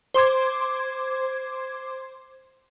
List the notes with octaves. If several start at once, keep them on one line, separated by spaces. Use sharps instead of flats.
C5 C6 D6 G#6